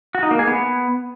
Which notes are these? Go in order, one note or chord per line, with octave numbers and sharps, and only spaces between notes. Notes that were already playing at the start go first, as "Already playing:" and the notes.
F#4
D#4
A#3
G#4
B3